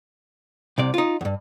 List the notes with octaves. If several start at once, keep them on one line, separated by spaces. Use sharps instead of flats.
C2 C3 D5
D#4 F4
E2 G2